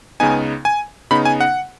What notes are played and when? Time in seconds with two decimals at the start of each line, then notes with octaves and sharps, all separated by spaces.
0.20 C#2 C#3 B3 D#4 G#5
0.65 G#5
1.11 C#3 B3 D#4 B5
1.25 G#5
1.41 F#5